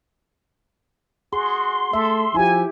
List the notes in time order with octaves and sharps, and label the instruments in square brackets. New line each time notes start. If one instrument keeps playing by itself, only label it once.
[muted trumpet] F#4 [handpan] G#4 [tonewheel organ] C6
[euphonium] A3 [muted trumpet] A4 [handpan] E5
[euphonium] F3 [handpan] E4 G4 [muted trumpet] G#5